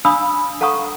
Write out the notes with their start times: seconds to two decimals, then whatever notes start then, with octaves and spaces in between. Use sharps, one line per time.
0.05 D4 F5 B5 D#6 E6
0.61 A4 F5 F#5 A#5 C#6 D#6